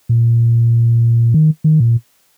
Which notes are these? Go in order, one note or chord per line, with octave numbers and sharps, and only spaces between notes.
A#2
D#3
D#3
A#2